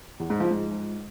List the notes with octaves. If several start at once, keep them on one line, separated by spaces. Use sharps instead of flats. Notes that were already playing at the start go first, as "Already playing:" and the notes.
E2
G#2
F3
G#2